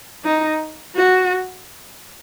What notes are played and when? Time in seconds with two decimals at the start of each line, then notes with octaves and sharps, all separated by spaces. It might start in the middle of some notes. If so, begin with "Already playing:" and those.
0.25 D#4
0.96 F#4